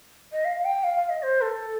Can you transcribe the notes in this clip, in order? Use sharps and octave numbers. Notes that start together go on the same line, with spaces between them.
D#5
F5
G5
F5
F5
D#5
C5
A4